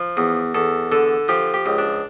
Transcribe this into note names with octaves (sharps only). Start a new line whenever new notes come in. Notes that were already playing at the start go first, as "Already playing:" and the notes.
Already playing: F3
E2
E2 A4
D3 A4
F3 G4
G4
C#2
D4